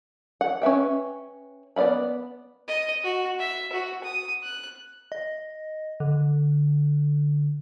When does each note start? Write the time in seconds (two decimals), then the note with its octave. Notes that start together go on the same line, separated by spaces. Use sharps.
0.41 F#5
0.62 C#4 B4 E5 G5
1.76 B3 D5 D#5 F5 B5
2.68 D#5
3.04 F#4
3.39 E5
3.72 F#4
4.04 D#6
4.43 F#6
5.12 D#5
6.00 D3